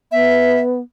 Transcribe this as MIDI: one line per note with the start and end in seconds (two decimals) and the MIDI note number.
0.12 0.80 59
0.12 0.60 76